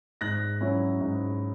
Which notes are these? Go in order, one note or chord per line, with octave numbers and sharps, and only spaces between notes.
G#2 F#6 A#6
F#3 C#4 E4
G#2